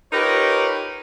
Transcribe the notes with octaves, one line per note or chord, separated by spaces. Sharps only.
D#4 F4 G4 A#4 B4 C#5